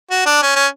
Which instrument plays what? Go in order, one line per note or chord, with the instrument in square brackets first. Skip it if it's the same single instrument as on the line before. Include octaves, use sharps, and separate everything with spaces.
[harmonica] F#4
D4
C#4
C#4